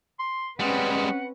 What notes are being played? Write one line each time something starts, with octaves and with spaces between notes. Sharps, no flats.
C6
G3 G#3 C4 C#4 B4 F#5